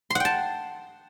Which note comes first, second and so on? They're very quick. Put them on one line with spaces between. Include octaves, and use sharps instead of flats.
C6 F#5 G5 A5